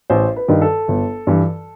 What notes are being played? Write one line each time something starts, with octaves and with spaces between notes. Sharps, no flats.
A1 C5
B4
G2 D#3
A4
G1
G2 E3